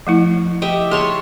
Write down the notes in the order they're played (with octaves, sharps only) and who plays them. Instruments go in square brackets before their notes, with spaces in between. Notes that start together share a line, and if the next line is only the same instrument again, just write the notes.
[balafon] F3 A3 E4
[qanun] G4 D#5 E5
[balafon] G#4 [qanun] C#5 A5 C6